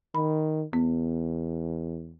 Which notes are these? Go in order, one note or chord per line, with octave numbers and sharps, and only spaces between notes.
D#3 B5
E2 B3